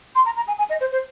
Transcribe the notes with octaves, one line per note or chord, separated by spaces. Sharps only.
C6
A#5
A#5
G#5
G#5
D#5
C5
C5